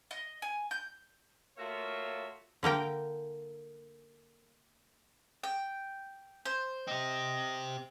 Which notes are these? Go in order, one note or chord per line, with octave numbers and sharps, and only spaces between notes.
D#5
G#5
G6
A3 A#3 F4 F#4 C#5 E5
D3 A#3 A#4 G5
G5
C5
C4 G4 D#5